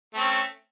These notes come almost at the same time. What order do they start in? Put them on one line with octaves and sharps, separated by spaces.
A3 C4 C#4